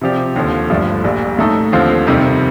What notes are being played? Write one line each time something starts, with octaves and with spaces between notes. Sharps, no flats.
C3 F3 C4 G4 D5
D#2 D3 F3
G1 G2 F3 A3
A#1 A#2 G3
A2 A3 D#4 A4
D#2 D3 F3 C4 F4
F2 C3 D#3 G3 C4